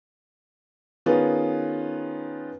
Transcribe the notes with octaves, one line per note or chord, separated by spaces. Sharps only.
D#3 B3 C#4 F4 G#4 B4